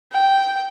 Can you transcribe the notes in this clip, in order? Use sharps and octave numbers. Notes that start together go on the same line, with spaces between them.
G5